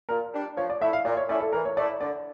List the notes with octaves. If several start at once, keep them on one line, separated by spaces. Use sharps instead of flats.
A#2 A#4
G3 D4
F3 C#5
D5
A3 E4 E5
F5
A#2 D5
C#5
A3 C#4 E4 D5
A4
E3 A#4
C#5
A3 E4 D5
D3 D5